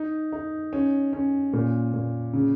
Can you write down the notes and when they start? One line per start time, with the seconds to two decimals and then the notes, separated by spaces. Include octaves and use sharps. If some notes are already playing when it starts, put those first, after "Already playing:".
Already playing: D#4
0.32 D#4
0.73 C#4
1.13 C#4
1.53 A#2
1.94 A#2
2.33 C#3